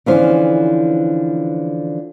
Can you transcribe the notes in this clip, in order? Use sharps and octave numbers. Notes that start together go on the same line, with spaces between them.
D3 E3 F3 C#4 C5